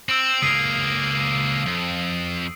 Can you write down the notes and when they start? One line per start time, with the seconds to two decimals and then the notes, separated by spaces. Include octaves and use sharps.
0.09 C4 E6 D7 F#7
0.42 C#2 A#3 D#6 C7 D#7
1.66 F2